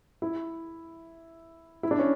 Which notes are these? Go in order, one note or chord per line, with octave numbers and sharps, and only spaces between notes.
E4
E4
D4
C#4